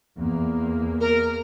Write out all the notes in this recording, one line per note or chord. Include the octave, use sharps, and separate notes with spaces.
E2 A#3
A#4